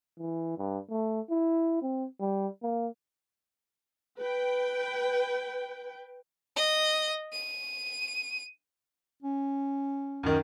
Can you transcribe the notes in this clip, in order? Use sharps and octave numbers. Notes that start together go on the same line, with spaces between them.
E3
G2
A3
E4
C4
G3
A#3
B4 G5
D#5
D#7
C#4
F#2 D#3